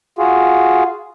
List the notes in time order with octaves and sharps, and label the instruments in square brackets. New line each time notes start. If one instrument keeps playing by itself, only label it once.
[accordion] F4 F#4 G#4